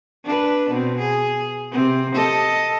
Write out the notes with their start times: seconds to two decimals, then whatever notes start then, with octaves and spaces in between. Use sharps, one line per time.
0.24 D4 B4
0.70 B2 C4
0.98 G#4
1.71 C3 C4
2.15 A4 D#5